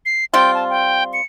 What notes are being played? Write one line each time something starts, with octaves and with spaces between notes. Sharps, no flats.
C7
G3 C4 F4 G5
A5
G5
C#7